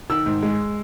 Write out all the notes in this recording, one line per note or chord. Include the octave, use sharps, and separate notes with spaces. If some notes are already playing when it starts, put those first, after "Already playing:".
D#3 E6
G#2
G#3